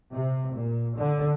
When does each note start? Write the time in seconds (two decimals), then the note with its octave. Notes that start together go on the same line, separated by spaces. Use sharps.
0.12 C3
0.52 A#2
0.97 D3